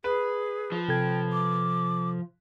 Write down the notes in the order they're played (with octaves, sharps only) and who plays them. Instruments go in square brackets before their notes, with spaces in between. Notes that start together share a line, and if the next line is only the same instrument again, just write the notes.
[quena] G#4 [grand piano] B4
[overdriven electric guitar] F3
[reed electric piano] C3 A4 G#6 [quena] G5
[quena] D6